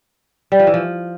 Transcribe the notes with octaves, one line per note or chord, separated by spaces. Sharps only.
G3
F3
E3
F3